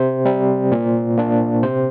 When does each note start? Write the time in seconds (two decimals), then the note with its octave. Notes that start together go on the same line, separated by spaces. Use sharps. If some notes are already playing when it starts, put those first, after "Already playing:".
Already playing: C3 C5
0.25 G3 C4
0.71 A#2
1.18 A#3 D4
1.63 C3 C5